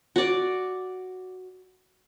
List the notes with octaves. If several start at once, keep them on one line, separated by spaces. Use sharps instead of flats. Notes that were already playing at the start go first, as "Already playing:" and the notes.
F#4 D5